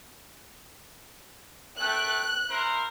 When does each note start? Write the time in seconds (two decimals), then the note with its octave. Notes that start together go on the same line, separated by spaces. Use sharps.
1.80 A3 G5 F#6
2.49 E4 A#4 C5